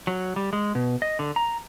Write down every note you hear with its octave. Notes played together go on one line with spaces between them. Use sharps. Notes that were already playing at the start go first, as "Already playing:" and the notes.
F#3
G3
G#3
B2
D#5
D3
A#5